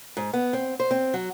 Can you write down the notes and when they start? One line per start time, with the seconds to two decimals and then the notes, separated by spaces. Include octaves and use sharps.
0.17 G#2
0.34 B3
0.53 C4
0.80 C5
0.91 C4
1.14 F#3